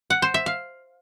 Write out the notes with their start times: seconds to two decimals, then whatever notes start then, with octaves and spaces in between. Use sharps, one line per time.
0.10 F#5
0.22 C5
0.34 E5
0.46 F5